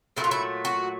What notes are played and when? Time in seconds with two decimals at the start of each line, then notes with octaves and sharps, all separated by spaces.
0.17 A#2 F#3 A3 E4
0.24 F4
0.31 E4
0.65 F#4